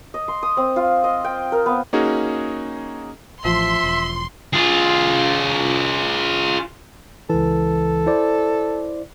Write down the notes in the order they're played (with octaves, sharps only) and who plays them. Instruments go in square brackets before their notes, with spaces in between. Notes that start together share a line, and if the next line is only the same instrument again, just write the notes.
[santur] D#5
C6
D#6
C4
F4
D#5
G5
A#4
B3
[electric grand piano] A#3 C#4 D#4 F#4 G#4
[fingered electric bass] A1 [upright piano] F3 [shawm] E5 [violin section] C6
[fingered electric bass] E1
[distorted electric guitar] F4 G#4
[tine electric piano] C#2 E3 [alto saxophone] A4
[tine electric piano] E4 C5 D5